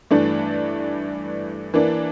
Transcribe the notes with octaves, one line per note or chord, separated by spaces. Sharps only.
G2 E3 A3 D4
E3 A#3 D4